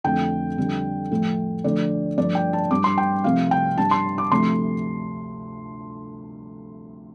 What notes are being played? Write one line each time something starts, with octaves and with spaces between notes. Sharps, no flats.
F2 D3 F3 A3 G5
F2 D3 G3
A2 F3 A3
D2 D3 F3 A3 D5
G2 F3 A3 D5
G5
A5
G2 G3 D6
C6
G5
C2 C3 F3 A3 F5
G5
G2 G3 A5
C6
D6
D2 C3 F3 A3 C6